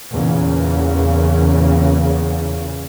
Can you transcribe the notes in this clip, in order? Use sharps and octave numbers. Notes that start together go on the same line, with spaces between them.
E2 A#2 C#3